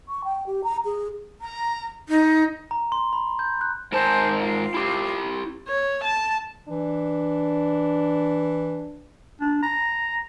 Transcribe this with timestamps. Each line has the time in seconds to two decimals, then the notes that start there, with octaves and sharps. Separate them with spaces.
0.08 C#6
0.24 G5
0.47 G4
0.64 A#5
0.85 G#4
1.41 A#5
2.09 D#4
2.71 A#5
2.92 C6
3.13 B5
3.39 G6
3.61 F#6
3.92 G#2 A#4 C5 G#5 A5
4.40 F4
4.74 E4 G4
5.68 C#5
6.04 A5
6.69 E3 D4
9.41 D4
9.63 A#5